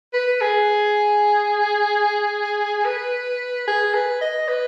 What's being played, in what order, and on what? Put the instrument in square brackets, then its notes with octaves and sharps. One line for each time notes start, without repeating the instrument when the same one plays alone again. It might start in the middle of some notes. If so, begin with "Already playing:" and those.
[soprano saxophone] B4
G#4
B4
G#4
B4
D#5
B4